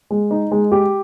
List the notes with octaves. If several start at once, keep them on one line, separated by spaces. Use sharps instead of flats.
G#3
D#4
G#3
G4